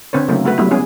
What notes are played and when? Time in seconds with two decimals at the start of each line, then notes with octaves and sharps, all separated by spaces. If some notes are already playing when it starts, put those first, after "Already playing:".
0.13 D3 C4 B4 C#5
0.28 C#3 F#3 A3 A#3 C4 D#4
0.44 G#3 A3 F#4 B4
0.58 F#3 G3 A3 B3 E4
0.71 B3 C#4 E4 G#4